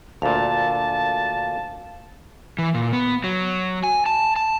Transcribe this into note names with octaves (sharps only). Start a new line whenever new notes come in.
D2 A#2 F5 A5
E3
A#2
B3
F#3
G#5
A5
A5